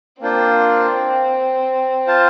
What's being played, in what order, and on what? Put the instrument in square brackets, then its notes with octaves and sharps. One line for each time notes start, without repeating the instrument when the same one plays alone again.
[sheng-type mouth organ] A#3 D4 F4 C5 [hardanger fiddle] C4
[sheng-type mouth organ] F4 C5 F5 A5